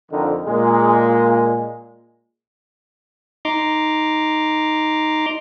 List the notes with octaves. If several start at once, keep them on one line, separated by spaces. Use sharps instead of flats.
F2 D3 D#3
A#2 G#3
D#4 A#5 C6 D6